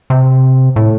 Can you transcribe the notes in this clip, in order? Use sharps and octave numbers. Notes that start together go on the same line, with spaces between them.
C3
A2